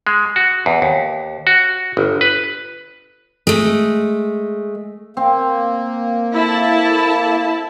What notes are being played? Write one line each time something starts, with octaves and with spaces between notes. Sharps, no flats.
G#3
F#4
E2
D#2
F#4
G1
B4
G#3 A3
A#3 C4
E4 A4 A5